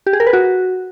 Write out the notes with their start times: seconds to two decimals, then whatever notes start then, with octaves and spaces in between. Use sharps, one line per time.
0.06 G4
0.13 G#4
0.20 A#4
0.27 B4
0.33 F#4